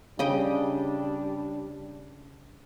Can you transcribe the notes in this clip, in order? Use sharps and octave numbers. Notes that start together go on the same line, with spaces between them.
C#3 G3 D4 D#5 G5